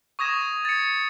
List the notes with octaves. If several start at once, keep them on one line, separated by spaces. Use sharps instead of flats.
C#6 D#6 G#6 A#6 E7
A6 C#7